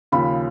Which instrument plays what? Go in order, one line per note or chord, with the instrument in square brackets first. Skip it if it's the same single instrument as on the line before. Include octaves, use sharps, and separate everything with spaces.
[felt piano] D#2 C#3 F3 B5